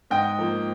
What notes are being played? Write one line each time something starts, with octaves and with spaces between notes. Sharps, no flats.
G#2 D#5 G5
F3 A#3